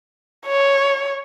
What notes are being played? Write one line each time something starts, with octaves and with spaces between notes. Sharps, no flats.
C#5